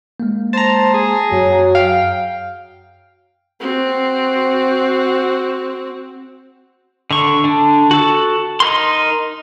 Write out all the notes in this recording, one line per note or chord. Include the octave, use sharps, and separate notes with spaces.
G#3 A#3
C5 A5 A#5
G#4
F#2 F#3
F5 G5
C4 F#4
D3 C#6
D3 D4
F#4 A4
D#4 A#4 C6